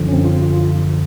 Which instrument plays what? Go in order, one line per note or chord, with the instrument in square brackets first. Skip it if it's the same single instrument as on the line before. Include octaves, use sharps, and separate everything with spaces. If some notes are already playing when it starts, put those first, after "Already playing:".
Already playing: [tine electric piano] F#2 D3 F3
C#4
C4
F4
F4